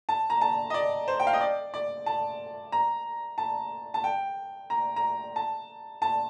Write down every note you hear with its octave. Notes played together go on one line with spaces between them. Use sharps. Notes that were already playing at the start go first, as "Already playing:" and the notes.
A5
A#5
A5
D#5
D5
C5
G5
F5
D#5
D5
D5
A5
A#5
A5
A5
G5
A#5
A#5
A5
A5